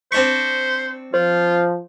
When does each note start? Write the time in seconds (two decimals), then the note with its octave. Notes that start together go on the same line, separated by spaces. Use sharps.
0.12 C4 D4 C5 C#6 B6
1.14 F3 F4 C5